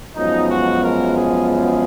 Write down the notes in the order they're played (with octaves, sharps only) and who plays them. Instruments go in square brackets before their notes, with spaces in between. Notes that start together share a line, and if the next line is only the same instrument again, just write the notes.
[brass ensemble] F#2 F3 G#3 B3 D#4
F#4
A#4
G#4
G#4